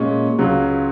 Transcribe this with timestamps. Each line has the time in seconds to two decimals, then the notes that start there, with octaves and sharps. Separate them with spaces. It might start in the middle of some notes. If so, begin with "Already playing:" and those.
Already playing: A#2 G#3 C#4
0.38 C#2 C#3 F#3